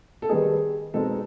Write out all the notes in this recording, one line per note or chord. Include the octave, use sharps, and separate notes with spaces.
A4
D#3 G3 B3 D#4 G#4
B2 G#3 C4 D#4 A4